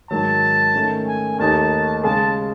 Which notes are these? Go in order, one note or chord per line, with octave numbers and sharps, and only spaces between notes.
G#2 D#3 F#3 A5
D#3 A3 C#4
G#5
D#2 D#3 A3 D#4 A5
C#3 G#3 C#4 G#4 A5